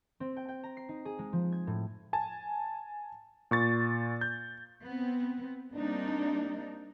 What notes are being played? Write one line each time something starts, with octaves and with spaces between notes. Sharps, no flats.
C4
G5
G5
A#5
C7
D#4
G#4
G#3
F3
G#6
A2
G#5 A5
A#2 C#6 A6
G6
B3 C4
G3 A#3 C4 D4 D#4